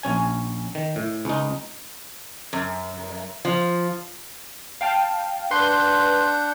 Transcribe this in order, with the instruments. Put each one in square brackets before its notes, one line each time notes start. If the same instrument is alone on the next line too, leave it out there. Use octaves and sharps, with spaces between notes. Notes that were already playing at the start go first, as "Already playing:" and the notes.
[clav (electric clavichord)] A#1 C#4 G#5
D#3
A2
C#2 D#4
[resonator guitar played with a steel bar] F#2
F3
[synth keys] F5 G5 A5
[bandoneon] D4 F#5 G6 [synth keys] B4 C6